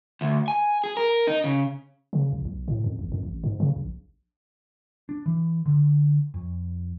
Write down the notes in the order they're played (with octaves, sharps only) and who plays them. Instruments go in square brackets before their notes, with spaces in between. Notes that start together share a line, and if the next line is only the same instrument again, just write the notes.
[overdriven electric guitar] D2
G#5
G#4
A#4
D#4
C#3
[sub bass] C#3
A#1
B1
A2
F2
A1
F2
A1
G#2
C#3
A#1
[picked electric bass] D4
E3
D3
F2